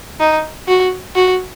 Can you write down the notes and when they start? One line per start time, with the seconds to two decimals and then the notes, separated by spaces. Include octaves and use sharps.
0.20 D#4
0.68 F#4
1.16 F#4